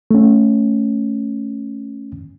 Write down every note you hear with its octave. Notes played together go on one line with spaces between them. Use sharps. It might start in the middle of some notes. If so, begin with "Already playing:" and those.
A3 C#4